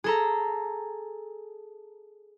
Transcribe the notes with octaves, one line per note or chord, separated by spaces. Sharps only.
G#4 A4 A#5